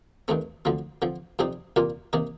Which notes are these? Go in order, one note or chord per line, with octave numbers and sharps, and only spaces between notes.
G2 D#3 A3 C4
D2 D3 F3 C4
D3 F3 C4
F2 C3 G3 C4 D#4
C2 A#2 G3 A#3 F4
C3 D#3 A#3 D#4